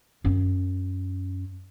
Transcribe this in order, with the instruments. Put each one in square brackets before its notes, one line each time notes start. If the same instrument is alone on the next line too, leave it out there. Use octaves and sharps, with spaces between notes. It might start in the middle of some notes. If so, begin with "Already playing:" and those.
[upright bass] F#2 C#4